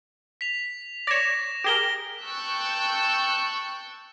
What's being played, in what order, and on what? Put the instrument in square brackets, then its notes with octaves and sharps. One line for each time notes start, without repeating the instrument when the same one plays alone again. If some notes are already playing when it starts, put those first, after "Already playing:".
[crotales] B6 F7
[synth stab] C#5 D5 [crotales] A#6 E7
[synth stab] G4 G#4 A#4 [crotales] D7 G7
[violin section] G5 A5 C#6 E6 F#6 G6